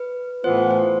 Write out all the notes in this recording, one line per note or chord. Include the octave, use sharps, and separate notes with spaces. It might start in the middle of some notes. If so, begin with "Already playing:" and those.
Already playing: B4
A2 E3 B3 F4 C5
C5